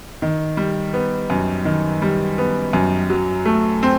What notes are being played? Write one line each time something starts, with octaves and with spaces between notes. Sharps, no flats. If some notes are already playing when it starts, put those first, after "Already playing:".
D#3
G3
B3
F#2
D#3
G3
B3
F#2
F#3
A3
C4